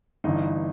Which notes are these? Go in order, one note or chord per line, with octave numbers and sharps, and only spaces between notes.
G1 G2 E3 D#4